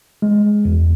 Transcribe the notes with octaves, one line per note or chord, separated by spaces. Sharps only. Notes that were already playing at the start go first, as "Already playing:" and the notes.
G#3
E2